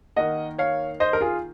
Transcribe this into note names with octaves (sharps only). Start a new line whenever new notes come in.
D#3 A#3 D#5 F#5
C#5 F5
C5 D#5
A#4
F4 G#4